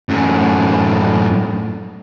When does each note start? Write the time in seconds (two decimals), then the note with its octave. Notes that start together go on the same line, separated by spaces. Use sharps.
0.09 F#2 A2